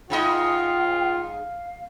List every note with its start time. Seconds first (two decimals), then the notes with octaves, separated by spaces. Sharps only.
0.10 G#2 D#4 F4 D#5 G5
1.23 F5